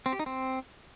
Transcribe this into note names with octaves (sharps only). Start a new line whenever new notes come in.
C4
G4
D#4
C4